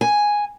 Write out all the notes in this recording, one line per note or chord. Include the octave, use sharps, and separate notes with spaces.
G#5